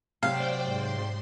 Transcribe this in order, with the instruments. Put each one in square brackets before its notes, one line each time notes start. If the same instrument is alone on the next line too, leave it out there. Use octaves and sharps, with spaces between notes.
[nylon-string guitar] C3 F#3 [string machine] C5 D5 G5 [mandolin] F5
[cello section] G#2 [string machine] C6